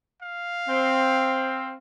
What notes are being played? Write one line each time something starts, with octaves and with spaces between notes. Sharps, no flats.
F5
C4